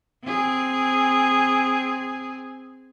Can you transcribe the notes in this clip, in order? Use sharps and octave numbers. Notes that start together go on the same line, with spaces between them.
C4 G#4